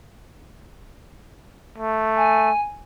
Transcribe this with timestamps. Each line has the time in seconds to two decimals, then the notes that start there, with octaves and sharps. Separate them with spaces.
1.78 A3
2.16 G#5